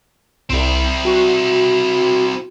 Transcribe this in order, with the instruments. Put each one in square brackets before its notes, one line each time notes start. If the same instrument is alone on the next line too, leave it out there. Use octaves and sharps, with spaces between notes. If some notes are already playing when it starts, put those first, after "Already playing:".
[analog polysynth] C2 [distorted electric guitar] C4 E4
[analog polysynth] F#4